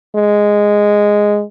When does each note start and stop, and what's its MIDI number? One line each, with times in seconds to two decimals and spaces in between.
0.16 1.43 56